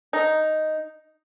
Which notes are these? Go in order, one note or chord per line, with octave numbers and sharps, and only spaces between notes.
D#4